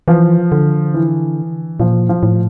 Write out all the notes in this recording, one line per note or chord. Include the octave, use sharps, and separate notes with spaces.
E3 F3
D3
E3
A#2 F3
F3
A2